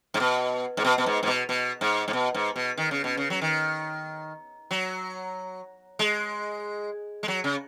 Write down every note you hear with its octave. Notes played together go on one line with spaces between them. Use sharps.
G#2
B2
G#2
B2
B2
G#2
G#2
B2
B2
G#2
G#2
B2
G#2
B2
D#3
C#3
B2
C#3
F#3
D#3
F#3
G#3
G#3
F#3
C#3